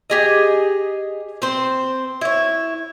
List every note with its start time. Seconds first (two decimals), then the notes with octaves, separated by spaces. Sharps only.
0.10 G4 G#4 D#5
1.42 C4 C5
2.21 E4 C#5